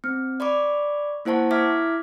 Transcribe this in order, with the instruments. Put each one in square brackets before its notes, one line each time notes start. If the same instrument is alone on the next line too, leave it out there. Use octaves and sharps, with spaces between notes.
[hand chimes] C4
D5 B5 C#6 D6
A#3 E4 C5 F#5 A5 C#6
E4 E5 D6 F6 G#6 B6